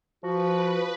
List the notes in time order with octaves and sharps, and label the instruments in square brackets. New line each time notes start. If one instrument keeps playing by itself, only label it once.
[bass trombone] F3 [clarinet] F#4 [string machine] B4